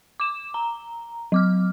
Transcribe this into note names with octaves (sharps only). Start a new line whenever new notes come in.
D6 E7
A#5
F#3 D6 F6